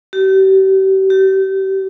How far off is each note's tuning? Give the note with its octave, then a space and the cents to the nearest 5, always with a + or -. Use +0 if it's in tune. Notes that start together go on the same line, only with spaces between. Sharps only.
G4 -35
G4 -30